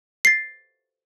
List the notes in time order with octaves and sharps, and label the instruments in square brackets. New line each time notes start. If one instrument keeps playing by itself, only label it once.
[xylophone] A6 C7